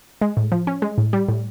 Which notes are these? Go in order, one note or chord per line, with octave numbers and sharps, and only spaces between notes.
G#3
A2
F3
C#4
G#3
A2
G3
A2